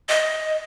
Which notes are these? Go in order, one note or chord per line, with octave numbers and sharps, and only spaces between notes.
D#5